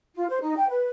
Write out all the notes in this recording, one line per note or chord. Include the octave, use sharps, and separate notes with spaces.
F4
C5
D#4
G5
B4